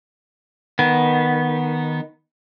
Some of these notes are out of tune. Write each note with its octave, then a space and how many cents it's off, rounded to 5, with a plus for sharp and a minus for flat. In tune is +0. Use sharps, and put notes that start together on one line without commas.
D#3 +0 B3 -10